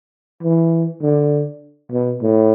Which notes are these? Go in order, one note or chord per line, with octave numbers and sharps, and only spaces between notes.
E3
D3
B2
A2